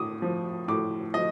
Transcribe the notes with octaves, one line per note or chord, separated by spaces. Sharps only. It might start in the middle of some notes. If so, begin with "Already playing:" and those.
Already playing: A2 D6 D#6
F3
A2 D6
F3 D#5